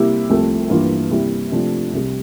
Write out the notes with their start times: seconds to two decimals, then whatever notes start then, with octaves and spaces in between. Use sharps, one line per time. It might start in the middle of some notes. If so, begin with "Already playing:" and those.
Already playing: C3 G3 A#3 E4 G4
0.29 C2 C3 F3 A3
0.70 G2 E3 A#3 F4
1.11 C3 G3 A#3 E4 G4
1.52 C3 F3 A3 D4
1.93 C2 C3 G3